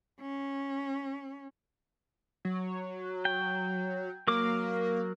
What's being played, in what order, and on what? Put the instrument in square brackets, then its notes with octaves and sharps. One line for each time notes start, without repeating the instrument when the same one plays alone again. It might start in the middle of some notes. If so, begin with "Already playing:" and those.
[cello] C#4
[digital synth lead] F#3
[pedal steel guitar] G5
[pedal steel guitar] F#3 A#4 D6 [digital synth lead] A#3